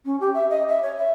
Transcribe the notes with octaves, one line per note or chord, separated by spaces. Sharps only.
C#4
G4
E5
D#5
E5
C#5
E5